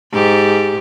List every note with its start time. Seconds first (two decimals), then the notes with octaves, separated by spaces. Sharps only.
0.12 G#2 G4